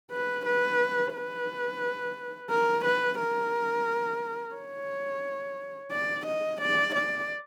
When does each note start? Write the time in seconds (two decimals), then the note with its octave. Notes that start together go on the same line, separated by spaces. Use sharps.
0.11 B4
0.46 B4
1.14 B4
2.50 A#4
2.85 B4
3.19 A#4
4.55 C#5
5.92 D5
6.26 D#5
6.61 D5
6.95 D5